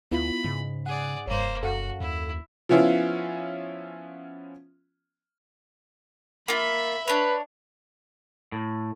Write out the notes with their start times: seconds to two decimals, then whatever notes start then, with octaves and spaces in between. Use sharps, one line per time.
0.11 D2 B3 E4 F4 B5
0.44 G#2 C#3
0.86 G#4 D5 F#5
1.27 F1 G2 A#3 C5 C#5
1.63 F#2 F#4 A4 F5 F#5
2.00 D#2 E4
2.69 F3 B3 C#4 E4 F4
6.48 A#3 F4 E5 B5
7.08 D4 B4 C#5
8.52 A2